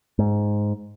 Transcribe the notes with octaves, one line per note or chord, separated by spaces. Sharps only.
G#2